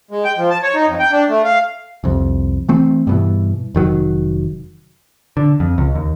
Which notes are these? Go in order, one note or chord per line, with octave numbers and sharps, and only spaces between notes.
G#3
G5
F3
A5
C#5
D#4
F2
G5
D4
A3
F5
C2 F2
E3 A3 C4
G2 B2 E3
F1 D#3 F#3
D3
F2
C#2
D#2